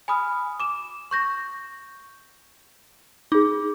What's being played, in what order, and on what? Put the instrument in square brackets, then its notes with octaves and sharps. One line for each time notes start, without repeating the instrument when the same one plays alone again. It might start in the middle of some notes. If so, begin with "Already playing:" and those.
[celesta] G#5 B5 D#6 F6
D6 E7
C#6 G6 A#6
[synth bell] D#4 [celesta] G#4 D6